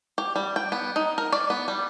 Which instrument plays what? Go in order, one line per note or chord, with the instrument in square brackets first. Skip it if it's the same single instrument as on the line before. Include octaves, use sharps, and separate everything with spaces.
[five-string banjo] G4
G3
G5
B3
D#4
A#4
D5
B3
G3